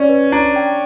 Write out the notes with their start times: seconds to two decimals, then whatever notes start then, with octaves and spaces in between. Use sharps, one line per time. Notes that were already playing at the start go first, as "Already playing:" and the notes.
Already playing: C#4 D5
0.09 B4
0.32 D4 A#5
0.56 G5